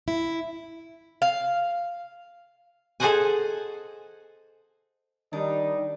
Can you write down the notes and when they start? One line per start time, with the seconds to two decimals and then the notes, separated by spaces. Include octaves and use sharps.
0.08 E4
1.22 F5
3.00 G#4 A4 C5 D#5 F#5 G#5
5.33 D#3 G3 D4 D#4